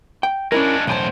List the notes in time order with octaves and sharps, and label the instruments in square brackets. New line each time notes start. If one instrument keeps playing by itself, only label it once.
[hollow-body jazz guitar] G5
[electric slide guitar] G#3 D4 [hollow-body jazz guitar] C#4 E4 A#4
[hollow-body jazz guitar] B1 G#5 A5 [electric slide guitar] E2 A2 C5